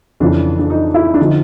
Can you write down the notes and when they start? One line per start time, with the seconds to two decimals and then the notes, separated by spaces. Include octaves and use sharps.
0.20 F2 C#3 E3 D4
0.59 D4
0.70 D#4
0.94 E4
1.14 D4
1.19 D3 F3 D#4